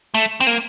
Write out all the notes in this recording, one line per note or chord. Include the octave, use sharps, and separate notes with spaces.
A3
C4
A#3